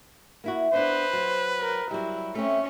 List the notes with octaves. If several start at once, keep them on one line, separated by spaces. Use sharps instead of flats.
A#3 E4 F#4
B3 D4 D#4 B4 C5
F#3
A#4
F#3 G3 E4
A3 C4 C#4